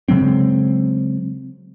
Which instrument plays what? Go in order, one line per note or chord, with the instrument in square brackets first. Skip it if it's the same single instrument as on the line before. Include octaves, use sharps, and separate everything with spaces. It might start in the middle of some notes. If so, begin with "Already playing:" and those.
[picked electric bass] C#3 F#3 G#3 C4